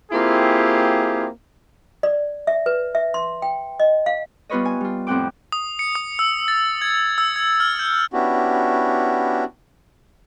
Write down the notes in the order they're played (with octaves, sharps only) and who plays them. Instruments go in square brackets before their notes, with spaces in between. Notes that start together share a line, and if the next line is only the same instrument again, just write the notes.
[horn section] A#3 C4 E4 F4 G4 G#4
[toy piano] D5
E5
B4
E5
C6
G5
D#5
F5
[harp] G3 B3 F4 B4 C#5 D#5
G#5
G3 F4
F2 A2 C4 F#5 G5 D6
[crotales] D#6
C#7
D#6
E6
A6
G#6
E6
G#6
F6
G6
[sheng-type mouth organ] B3 C#4 D4 E4 F#4 G4